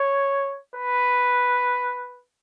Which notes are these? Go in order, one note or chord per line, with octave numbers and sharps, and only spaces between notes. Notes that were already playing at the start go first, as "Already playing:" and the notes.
Already playing: C#5
B4